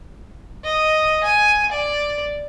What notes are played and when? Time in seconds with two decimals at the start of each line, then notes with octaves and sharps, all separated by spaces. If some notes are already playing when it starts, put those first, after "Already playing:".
0.64 D#5
1.24 G#5
1.72 D5